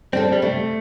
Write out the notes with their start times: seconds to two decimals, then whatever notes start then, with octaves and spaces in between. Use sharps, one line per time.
0.13 G3 C4 D4 A4
0.32 G3
0.42 C3 A3